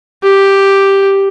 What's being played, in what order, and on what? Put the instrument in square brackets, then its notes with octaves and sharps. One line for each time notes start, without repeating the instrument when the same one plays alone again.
[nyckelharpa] G4